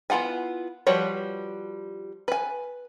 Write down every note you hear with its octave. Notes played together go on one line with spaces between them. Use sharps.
B3 E4 F4 F#5 G#5
F3 G3 F#4 B4 C#5
B4 G#5